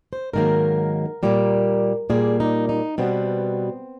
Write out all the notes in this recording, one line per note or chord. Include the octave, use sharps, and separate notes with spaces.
C5
G#2 D#3 F#3 A#3 A#4
A#2 G3 A#3
A#2 G3 A#3 G#4
D#4
D#4
B2 G3 B3 C4